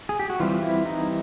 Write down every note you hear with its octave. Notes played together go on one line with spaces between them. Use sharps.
G#4
G4
F#4
E3 G3 C4 F4
E4
D#4